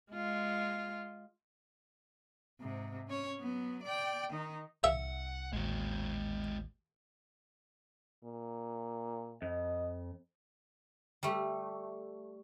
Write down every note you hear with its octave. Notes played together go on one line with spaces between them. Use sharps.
G#3 F4
G#2 C3
C#4 C#5
F#3 B3
D5 G5
D#3 D#4
C2 E5 F#5
A1 D#2 G#3 F#4
A#2
F2 D#5
G3 A3